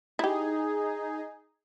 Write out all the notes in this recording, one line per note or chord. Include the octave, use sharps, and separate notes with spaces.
D#4 E4 G4 G#4